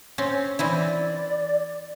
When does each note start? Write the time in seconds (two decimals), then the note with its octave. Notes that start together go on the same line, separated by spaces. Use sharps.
0.18 C4 C#4
0.59 E3 C4 E4 D5